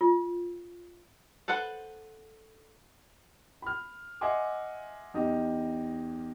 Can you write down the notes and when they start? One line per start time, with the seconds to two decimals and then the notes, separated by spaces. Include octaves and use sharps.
0.01 F4
1.48 A4 B4 C5 F#5
3.62 B5 F6
4.21 D#5 E5 F#5 G#5 C6 D6
5.14 E2 D#4 G4 D#5